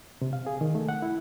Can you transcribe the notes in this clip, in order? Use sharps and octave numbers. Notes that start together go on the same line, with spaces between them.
C3
F5
G#4
D#3
A3
F#5
E4